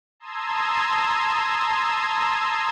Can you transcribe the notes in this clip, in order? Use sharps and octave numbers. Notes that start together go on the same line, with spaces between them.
A5 A#5 C6 D#6 E6 G#6